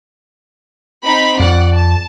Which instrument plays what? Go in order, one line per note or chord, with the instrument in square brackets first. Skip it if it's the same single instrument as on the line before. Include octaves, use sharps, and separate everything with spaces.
[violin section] C4 D#4 B5
[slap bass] F2 [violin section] D5 F#5
[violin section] A5